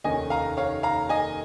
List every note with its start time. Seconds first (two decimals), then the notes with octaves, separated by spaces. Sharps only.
0.04 F1 D#2 D#3 C#4 D#5 G#5
0.30 F5 A#5
0.57 C#5 F5
0.83 F5 A#5
1.09 D#5 G#5